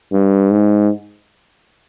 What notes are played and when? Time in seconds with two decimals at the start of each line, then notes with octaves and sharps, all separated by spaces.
0.13 G2
0.50 G#2